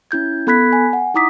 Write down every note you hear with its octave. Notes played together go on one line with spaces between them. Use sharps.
C#4 E4 G6 G#6
B3 A4 B5 F#6 G#6 B6
G#5
F#5
D#4 E4 A#5 D6 D#6 B6